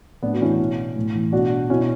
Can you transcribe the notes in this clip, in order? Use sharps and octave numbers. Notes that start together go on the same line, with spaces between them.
A2 B3 D4
F#4
E3 C#4 E4
B2
A2
E3
B2 D4 F#4
B2 C#4 E4